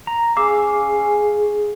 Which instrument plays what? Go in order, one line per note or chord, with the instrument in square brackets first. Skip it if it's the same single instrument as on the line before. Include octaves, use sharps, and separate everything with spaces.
[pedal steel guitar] A#5
[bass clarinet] C#4 [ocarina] G#4 [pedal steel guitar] F5 E6 [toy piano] D6